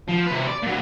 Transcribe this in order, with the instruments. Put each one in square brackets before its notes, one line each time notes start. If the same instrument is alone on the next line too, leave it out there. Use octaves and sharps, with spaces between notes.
[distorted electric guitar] F3
C3 B4
D5
A#2 F#3